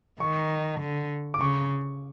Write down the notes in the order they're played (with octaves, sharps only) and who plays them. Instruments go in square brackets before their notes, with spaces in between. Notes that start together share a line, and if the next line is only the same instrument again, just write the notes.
[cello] D#3 [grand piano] C#6
[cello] D3
[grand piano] D6
[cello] C#3 [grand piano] C#6